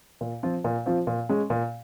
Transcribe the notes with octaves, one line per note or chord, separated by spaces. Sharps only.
A#2
F3 C4 F4
A#2
F3 C4 F4
A#2
G#3 C#4
A#2